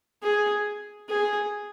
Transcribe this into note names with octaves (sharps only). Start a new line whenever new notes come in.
G#4
G#4